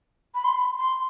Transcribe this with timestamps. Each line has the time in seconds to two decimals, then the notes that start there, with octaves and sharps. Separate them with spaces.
0.35 B5
0.44 C6
0.53 B5
0.78 C6